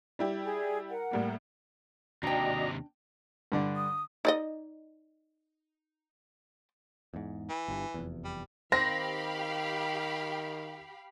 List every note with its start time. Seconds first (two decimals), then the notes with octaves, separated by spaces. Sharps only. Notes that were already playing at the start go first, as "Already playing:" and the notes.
0.19 G3 E4 G4
0.43 G#4
0.90 A#4 F#5
1.11 A2 G3 A#3
2.23 D#2 C3 D4 F#4 D5 D#5 G5 A#5
3.52 G2 D3 D4
3.76 D#6
4.25 D#4 D5 D#5
7.14 E2 G#2
7.49 E3
7.68 G1 G2
7.94 F1 E2
8.24 G3
8.72 D#3 C4 G4 F5 B5 A#6